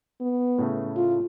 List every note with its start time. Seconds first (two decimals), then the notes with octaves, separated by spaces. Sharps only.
0.21 B3
0.59 A2 C#3 A3
0.96 F4